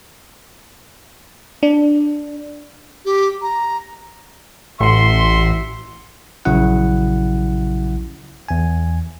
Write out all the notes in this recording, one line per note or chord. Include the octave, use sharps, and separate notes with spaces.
D4
G4
A#5
A1 F#4 E5 C6
A#1 C#3 F#3 E4 F#5
E2 G#5